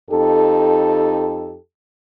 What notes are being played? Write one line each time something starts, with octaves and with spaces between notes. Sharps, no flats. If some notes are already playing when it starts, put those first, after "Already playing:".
F2 D#4 G4 A4